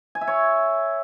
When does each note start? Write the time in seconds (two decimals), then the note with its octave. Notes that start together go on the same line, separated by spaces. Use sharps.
0.15 G#5
0.21 E5
0.27 C#5